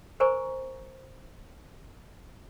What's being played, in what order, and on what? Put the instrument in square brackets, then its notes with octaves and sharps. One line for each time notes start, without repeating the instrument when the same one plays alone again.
[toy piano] A#4 C5 G#5 A#5 C#6